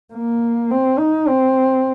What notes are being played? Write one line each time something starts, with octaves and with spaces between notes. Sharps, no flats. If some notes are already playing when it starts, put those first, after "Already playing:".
A#3
C4
D#4
C4